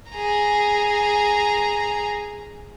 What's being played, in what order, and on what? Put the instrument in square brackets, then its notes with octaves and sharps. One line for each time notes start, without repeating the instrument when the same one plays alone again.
[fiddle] G#4 A#5